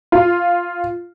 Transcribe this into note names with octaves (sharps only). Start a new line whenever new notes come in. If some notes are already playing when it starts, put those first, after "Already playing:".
F4